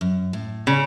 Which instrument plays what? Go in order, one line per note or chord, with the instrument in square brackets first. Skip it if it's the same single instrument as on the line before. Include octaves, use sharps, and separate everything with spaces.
[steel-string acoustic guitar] F#2
A2
[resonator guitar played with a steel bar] C#3